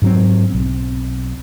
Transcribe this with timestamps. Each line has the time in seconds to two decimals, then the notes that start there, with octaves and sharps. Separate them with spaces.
0.02 G#2 F#3 C4
0.50 B1 C4